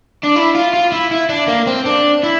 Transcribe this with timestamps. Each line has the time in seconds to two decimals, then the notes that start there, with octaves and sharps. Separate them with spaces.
0.23 D4
0.36 E4
0.55 F4
0.73 F4
0.92 E4
1.11 E4
1.29 D4
1.48 A#3
1.67 C4
1.86 D4
2.23 E4